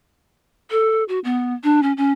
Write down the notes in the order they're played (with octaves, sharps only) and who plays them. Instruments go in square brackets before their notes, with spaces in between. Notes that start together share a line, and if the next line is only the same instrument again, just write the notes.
[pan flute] A4
F#4
B3
D4
C#4
C#4